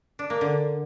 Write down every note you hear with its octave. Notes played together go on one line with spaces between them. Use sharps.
D4
A#3
D3